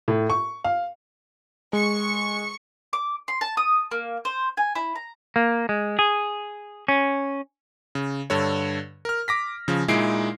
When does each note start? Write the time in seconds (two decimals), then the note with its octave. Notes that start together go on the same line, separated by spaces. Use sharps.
0.08 A2
0.30 C#6
0.64 F5
1.73 G#3 C#6 C#7
2.93 D6
3.28 C6
3.41 A5
3.57 D#6
3.91 A#3
4.25 C5
4.57 G#5
4.76 E4
4.95 A#5
5.36 A#3
5.69 G#3
5.99 G#4
6.88 C#4
7.95 C#3
8.30 G2 D3 A4 C#5
9.05 A#4 F6
9.28 D6 A#6 B6
9.68 C#3 F3
9.88 A#2 G#3 D#4 E4 C7 D7